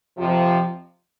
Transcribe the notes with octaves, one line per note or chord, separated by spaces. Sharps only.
F2 C3 F3